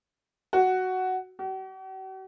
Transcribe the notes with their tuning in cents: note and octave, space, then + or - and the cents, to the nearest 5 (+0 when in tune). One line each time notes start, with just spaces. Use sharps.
F#4 +5
F#4 +45